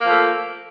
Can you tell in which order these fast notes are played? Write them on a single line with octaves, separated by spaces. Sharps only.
A#3 F3 A3